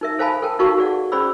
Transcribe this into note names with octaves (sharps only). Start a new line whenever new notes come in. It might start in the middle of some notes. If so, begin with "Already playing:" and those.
D#4 A#4 E5
A4 C5 F5 G#5 A5 B5
A4 A#4 G5 A5
D#4 F#4 A#4 F5 A5 C#6
G#4 D5 F#5
C#4 G#4 C5 D5 B5 E6